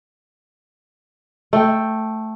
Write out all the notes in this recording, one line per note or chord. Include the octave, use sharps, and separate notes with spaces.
A3 G5